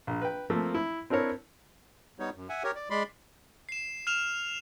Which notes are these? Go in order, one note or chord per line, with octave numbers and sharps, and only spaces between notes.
A#1
B4 G5
F3 A3 A#3 C4
E4
C4 D4 E4 A#4 C#5
G3 B3 D#4 C#5
F#2
E5 F#5 G#5
G4 A#4 C#5
D5
G#3 D5 B5 C6
C7 E7
F6 E7 F7